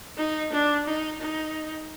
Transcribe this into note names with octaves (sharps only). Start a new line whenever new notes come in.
D#4
D4
D#4
D#4